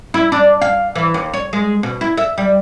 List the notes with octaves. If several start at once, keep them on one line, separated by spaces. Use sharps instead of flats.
E4
D4
F5
E3
D#2
C#5
G#3
B2
E4
E5
G3